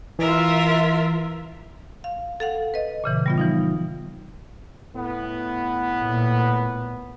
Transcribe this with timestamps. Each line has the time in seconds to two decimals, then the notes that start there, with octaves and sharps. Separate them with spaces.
0.19 E3 F4 A#4 E5
2.04 F5
2.40 A4 F5 F#5
2.74 B4 D#5
3.04 A#2 C#3 E3
3.26 G3 B3 F4
3.38 E3 F3 D#4
4.95 A2 B3
6.02 A#2